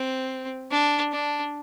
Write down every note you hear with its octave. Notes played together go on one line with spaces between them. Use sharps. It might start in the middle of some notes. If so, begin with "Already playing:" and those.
Already playing: C4
D4
D4